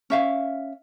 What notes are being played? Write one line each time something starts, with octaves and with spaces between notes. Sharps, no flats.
C#4 E5 F5